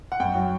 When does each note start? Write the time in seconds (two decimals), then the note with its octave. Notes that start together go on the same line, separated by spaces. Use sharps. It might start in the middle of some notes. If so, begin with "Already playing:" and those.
0.12 F#5
0.20 F#2 G5
0.35 F#3